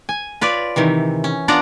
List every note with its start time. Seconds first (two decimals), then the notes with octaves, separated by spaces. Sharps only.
0.09 G#5
0.41 F4 B4 C#5 D5
0.76 C3 D#3 E3
1.24 C#4
1.48 B3 D4 F4 D5 F#5 A#5